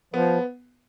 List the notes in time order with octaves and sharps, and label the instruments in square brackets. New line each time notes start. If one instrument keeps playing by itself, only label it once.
[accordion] F3 [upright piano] B3